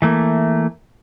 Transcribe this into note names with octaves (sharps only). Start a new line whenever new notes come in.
E3 A3 A#3